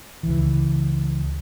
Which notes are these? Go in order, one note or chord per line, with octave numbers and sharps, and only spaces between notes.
C#2 E3